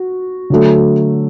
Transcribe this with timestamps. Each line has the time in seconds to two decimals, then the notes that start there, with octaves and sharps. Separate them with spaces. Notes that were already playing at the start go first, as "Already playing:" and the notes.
Already playing: F#4
0.50 D3 F#3 A3